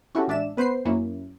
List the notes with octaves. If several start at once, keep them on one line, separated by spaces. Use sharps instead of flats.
C#4 E4 F#4 G4 A4
A1 G#3 D4 D5 E5 E7
B3 B4 C5 G6 C7
F#2 F#3 A#3 C#4 E4